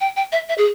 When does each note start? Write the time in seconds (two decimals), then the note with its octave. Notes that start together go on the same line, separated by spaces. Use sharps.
0.01 G5
0.17 G5
0.32 E5
0.49 E5
0.58 G#4